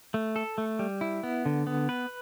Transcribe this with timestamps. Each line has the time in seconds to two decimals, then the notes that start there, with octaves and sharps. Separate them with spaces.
0.14 A3
0.36 A4
0.58 A3
0.79 G3
1.01 E4
1.23 B3
1.46 D3
1.67 B3
1.89 B4